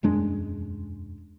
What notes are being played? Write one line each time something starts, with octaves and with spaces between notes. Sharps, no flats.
E1 F#2 G#3 D4